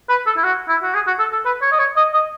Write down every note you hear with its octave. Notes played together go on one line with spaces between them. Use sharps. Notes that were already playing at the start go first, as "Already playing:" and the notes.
B4
A4
E4
F#4
E4
F#4
G#4
F#4
A4
A4
B4
C#5
D#5
C#5
D#5
D#5